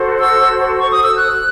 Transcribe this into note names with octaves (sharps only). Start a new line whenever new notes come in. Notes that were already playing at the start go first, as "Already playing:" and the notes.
Already playing: F#4 A4 C5
E6
C#6
D#6
E6
F#6